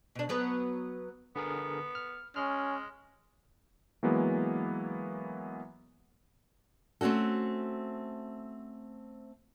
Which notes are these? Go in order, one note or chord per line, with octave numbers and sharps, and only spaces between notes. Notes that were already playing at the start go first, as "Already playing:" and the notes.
B2 D4
F#3 B3 B4
D3 B3 G#4 A#4
F6
G#3 C#4 F6
E3 F#3 G#3 A#3 B3
A3 C4 C#4 F#4 A4